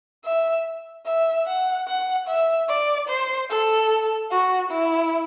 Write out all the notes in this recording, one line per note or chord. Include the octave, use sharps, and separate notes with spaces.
E5
E5
F#5
F#5
E5
D5
C5
A4
F#4
E4